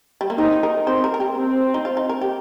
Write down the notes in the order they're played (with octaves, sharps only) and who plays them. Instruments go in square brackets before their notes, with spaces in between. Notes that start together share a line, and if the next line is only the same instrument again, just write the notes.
[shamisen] G3
A#3
[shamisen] C4 [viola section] D#4
[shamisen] A#4
[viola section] C4 [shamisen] C5
[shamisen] A#4
A#4
G4
[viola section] C4
[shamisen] D#4
F4
D#4
A#4
G4